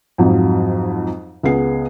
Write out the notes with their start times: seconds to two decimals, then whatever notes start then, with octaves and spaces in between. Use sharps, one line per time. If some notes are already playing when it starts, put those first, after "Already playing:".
0.18 F2 G#2 F3 F#3
1.43 C#2 B3 G#4 C7